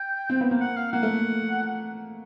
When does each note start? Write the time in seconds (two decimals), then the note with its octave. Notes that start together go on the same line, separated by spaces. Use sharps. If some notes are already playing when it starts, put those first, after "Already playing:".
Already playing: G5
0.29 C4
0.41 B3
0.51 A#3
0.61 F#5
0.77 F5
0.93 A#3 F#5
1.03 A3